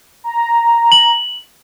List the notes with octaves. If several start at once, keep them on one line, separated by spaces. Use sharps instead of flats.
A#5
F#7